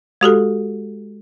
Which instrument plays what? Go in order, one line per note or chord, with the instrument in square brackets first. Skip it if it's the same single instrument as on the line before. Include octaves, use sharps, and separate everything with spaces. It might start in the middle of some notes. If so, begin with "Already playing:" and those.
[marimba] G#3 F#4 G4 A4